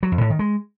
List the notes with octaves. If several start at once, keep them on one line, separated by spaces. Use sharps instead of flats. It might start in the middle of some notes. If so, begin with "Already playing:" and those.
F#3
F2
A2
D#3
G#3